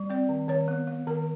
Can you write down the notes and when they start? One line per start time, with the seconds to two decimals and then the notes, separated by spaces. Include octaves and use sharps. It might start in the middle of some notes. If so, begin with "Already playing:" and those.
Already playing: G3
0.10 C4 D5
0.29 D#3
0.48 D#3 C#5
0.68 B3
0.87 B3
1.07 D#3 A#4